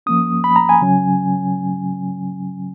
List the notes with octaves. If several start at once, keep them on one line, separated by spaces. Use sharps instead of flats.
F3 A#3 C#4 D#6
B5
A#5
G#5
C#3 F#3 C#4